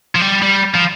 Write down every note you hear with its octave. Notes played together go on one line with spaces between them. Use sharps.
F3
G3
G3
F3